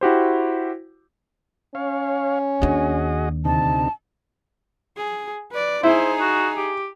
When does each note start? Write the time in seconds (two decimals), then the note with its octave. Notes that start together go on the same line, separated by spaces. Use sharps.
0.01 E4 F#4 G4 C5
1.75 C#4 C#5 F5
2.62 D#2 D4 F#4 G#4 D#5
3.45 D2 C3 D#4 A5
4.97 G#4
5.52 B4 D5
5.83 D#4 E4 G#4 C5
6.20 F#4
6.57 G4